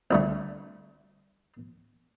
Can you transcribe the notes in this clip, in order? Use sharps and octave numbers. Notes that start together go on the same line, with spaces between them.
C2 D3 A3